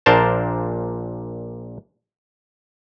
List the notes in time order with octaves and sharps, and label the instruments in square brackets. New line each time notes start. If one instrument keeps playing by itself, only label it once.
[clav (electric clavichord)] A#1 A#2 D4 A#4 C5 A5